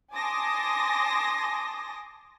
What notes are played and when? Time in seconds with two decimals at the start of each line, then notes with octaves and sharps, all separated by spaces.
0.13 G#5 A5 C6 D6 D#6 A#6